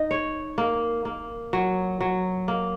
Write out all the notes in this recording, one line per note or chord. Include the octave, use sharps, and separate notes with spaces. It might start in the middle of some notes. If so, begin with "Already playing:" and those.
Already playing: D#4
C#5
A#3
A#3
F#3
F#3
A#3